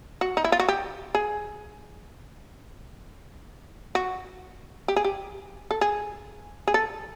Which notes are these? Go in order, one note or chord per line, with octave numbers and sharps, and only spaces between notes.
F#4
D#4
E4
F4
F#4
G4
G#4
F#4
G4
G#4
G4
A4
G#4
G#4
A4